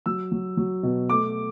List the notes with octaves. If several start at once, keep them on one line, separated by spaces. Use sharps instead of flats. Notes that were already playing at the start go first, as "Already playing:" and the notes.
F#3 E6
F#3
F#3
B2
A3 D6